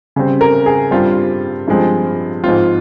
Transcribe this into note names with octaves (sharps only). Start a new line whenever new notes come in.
C#3 G3 C4
A#4
G#4
G2 G3 C4 F4
G2 F3 G#3 C4
G#2 F3 C4 F4